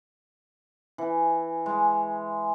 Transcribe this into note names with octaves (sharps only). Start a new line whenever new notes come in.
E3
G#3